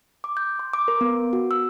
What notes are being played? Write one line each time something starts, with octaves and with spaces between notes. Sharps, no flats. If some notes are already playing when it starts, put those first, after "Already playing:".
D6
G6
C6
D6
A#4
B3
F#4
E6